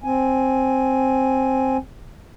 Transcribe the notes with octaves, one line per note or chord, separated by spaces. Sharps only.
C4 G#5